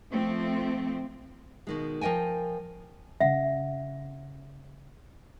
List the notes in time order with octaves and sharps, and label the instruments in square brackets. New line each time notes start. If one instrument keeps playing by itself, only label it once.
[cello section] F3 A3 C4
[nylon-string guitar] B2 D#3 G#3
F3 A#4 D#5 G5 G#5
[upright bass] C#3 [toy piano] E5 F#5